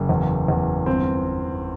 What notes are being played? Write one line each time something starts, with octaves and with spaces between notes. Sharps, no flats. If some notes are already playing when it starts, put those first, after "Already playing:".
Already playing: F#1
E2
E2
G1 C4